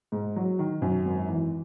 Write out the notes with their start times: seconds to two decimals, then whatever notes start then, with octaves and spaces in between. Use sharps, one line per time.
0.12 G#2
0.36 F#3
0.59 D#3
0.82 F#2
1.05 G#1
1.29 E3